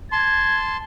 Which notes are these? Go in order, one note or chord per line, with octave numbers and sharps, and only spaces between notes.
A5 C6 G#6